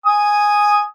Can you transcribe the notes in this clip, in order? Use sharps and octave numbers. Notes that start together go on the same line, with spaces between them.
G#5 D#6